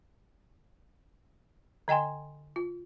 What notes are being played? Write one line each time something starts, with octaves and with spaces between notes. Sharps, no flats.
D3 D#5 G5 G#5 C6
F4